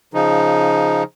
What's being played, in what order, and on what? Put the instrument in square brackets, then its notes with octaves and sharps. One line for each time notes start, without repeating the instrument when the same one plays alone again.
[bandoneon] C#3 F3 D#4